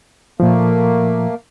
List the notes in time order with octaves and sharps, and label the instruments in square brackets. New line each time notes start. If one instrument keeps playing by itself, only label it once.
[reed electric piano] A#2 F3 [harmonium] A3 A#3